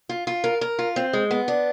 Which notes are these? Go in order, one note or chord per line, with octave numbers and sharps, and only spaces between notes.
F4
F4
A#4
A#4
F4
C4
G#3
B3
D4